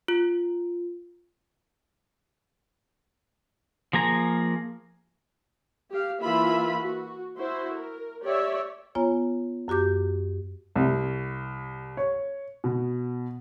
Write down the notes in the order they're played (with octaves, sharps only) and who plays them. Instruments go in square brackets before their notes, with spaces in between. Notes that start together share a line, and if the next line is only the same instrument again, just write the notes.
[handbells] F4
[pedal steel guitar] F3 A#3 G#4 A#5
[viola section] G4 F5
E3 A#3 F4 E5 B5
F#4
E4 F#4 C5
A#4
G4 C#5 D5 E5
[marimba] B3 F4 C#5 G#5 A#5
F#2 F#4 G4 D6 G6
[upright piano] C2
C#5
B2